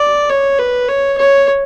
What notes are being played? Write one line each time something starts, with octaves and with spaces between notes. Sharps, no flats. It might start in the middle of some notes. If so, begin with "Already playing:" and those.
Already playing: D5
C#5
B4
C#5
C#5